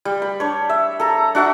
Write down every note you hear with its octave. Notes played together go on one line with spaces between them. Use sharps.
G3
B5
D4 C#5
E5
A4 A#5
D4 F#4 E5 F#5